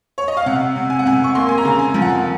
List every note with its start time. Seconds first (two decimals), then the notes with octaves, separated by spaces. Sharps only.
0.18 C#5
0.28 D#5
0.37 F5
0.46 C3 F#5
0.76 C3
0.90 G#5
0.99 F#5
1.06 C3 G#5
1.24 C#6
1.35 A#3 C6
1.49 G#5
1.58 A#5
1.65 C#3
1.79 G#5
1.94 F3
2.02 F#5